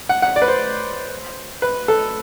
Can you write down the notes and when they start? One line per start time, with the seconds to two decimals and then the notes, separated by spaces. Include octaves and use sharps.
0.09 F#5
0.22 F#5
0.36 D5
0.42 B4
0.48 C5
1.62 B4
1.88 A4